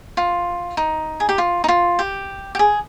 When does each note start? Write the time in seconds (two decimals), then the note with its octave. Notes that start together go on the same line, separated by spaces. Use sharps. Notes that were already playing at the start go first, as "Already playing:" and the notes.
0.17 F4
0.77 D#4
1.20 G#4
1.29 G4
1.38 F4
1.64 D#4
1.68 F4
1.99 G4
2.55 G4
2.59 G#4